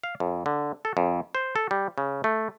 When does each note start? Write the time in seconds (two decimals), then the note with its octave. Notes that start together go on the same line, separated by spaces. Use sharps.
0.04 F5
0.20 F2
0.46 D3
0.85 A4
0.97 F2
1.35 C5
1.56 A4
1.71 G3
1.98 C#3
2.24 A3